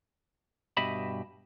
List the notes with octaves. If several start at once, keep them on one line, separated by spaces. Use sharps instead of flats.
G2 B2 G4 D#5 E5 B5